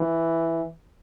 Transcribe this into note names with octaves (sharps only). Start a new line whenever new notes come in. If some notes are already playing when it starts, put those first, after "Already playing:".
Already playing: E3